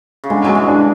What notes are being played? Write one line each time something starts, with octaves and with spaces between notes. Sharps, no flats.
C#3
D3 G#3
F#3 G#3
E3
D4